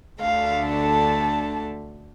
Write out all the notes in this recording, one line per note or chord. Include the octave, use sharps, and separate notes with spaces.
D2 D3 A3 D4 F5
A5